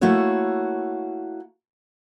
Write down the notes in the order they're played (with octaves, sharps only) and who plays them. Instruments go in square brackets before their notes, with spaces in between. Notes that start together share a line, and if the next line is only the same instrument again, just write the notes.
[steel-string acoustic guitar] A3 A#3 E4 F#4 C#5